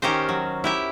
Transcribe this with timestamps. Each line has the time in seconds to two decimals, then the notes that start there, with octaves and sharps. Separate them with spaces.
0.02 D#3 C#4 G4 A#4 C5
0.29 F#3
0.64 E4 G4 E5